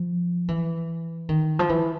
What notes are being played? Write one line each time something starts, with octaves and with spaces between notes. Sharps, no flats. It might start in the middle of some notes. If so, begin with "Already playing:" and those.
Already playing: F3
E3
D#3
F3
E3